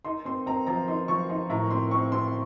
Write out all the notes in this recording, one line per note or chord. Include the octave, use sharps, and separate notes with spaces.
D#4 C6
C4 C6
C4 A#5
F3 A#5
D#4 C6
F3 C#6
D#4 C6
A2 A#5
C4 C6
C4 C#6
C4 C6